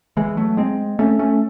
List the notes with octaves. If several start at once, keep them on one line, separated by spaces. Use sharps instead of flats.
E3 G#3
F#3 A3
G#3 C4
A3 C#4
A3 C#4